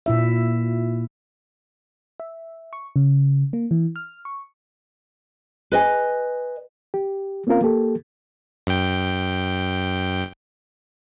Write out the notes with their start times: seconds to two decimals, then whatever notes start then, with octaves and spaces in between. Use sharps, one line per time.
0.06 A#2 E4 E5
2.20 E5
2.73 C#6
2.96 C#3
3.53 A#3
3.71 E3
3.96 F6
4.25 C#6
5.72 B4 D#5 G#5
6.94 G4
7.47 A#3 C4 C#4 F4 A#4 F5
7.63 A#3 G4 A4
8.67 F#2 G5